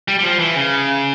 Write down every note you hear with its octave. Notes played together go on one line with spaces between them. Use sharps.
G3
G3
F3
E3
C#3